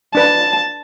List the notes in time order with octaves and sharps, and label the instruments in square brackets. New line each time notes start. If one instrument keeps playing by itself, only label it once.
[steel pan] D4 B4 [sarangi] A5